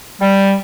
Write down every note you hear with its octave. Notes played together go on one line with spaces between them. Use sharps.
G3